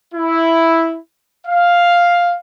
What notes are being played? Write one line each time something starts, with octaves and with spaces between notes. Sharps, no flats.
E4
F5